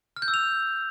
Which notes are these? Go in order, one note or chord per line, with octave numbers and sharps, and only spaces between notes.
F6
G6
E6
F7